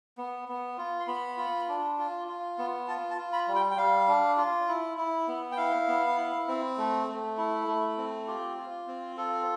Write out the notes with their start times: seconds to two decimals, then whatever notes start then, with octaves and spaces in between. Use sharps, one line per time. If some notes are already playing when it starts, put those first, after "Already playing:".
0.18 B3
0.48 B3
0.78 F4
1.00 C6
1.07 B3 B5
1.37 F4
1.69 D4
1.98 F4
2.28 F4
2.58 B3
2.88 F4 A5
3.10 A5
3.18 F4
3.33 B5
3.48 G3
3.55 G5
3.71 G5
3.77 G3 F5
4.08 D4
4.38 F4
4.68 E4
4.98 E4
5.28 B3
5.52 G5
5.57 E4 F5
5.88 B3
6.17 E4
6.48 C4
6.78 A3
7.07 A3
7.37 E4
7.67 A3
7.98 C4
8.27 F4 G4
8.57 F4
8.87 C4
9.17 F4 A4